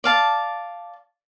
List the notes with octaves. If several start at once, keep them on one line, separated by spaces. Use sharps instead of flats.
D5 F5 A5